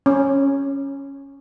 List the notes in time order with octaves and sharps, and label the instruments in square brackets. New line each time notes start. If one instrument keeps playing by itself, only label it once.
[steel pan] C#4